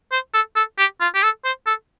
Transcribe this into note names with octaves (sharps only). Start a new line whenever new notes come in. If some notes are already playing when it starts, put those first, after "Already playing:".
C5
A4
A4
G4
F4
G4
A4
C5
A4